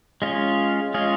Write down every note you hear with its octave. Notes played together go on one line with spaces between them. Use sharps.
G#3 C#4 F4 G#4
G#3 C#4 F4 G#4